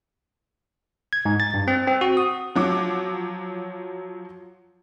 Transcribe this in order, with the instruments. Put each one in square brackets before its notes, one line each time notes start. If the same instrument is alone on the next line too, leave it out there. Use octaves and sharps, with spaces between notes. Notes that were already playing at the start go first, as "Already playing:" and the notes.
[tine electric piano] G#6
G#2
A6
G2
C4
C4
F#4
D#6
[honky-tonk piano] F3 F#3 D6